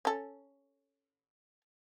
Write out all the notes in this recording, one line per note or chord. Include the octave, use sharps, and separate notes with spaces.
C#4 A4